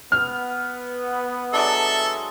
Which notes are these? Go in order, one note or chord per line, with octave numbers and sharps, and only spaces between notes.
B3 F6
F#3 G#3 D4 A4 E5